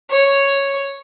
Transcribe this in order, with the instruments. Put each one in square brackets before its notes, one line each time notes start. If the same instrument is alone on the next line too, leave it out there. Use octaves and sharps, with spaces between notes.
[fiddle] C#5